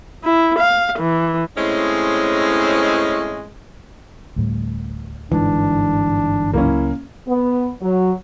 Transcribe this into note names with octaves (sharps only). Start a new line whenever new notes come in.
E4
F5
E3
A2 G#3 C4 C#4 D#5
D2 A2 G3
G1 G#2 E3 D4
C#2 F#3 A#3 C#4 E4
B3
F#3